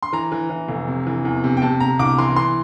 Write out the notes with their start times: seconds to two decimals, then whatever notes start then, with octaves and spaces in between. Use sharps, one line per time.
0.03 C6
0.13 E3 A#5
0.32 E3
0.50 E3
0.68 F1
0.88 C3
1.07 E3
1.25 E2
1.44 C3
1.57 G5
1.62 C3 A5
1.80 C3 A#5
1.99 C2 D6
2.18 E3 C6
2.36 E3 C6